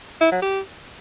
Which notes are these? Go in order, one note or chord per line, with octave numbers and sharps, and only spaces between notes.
E4
F#3
G4